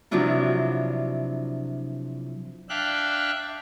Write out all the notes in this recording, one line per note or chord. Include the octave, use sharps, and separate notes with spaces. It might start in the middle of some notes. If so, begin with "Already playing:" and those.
C3 F3 F#3 D4 E4 F4
D4 E5 F5 G5 F#6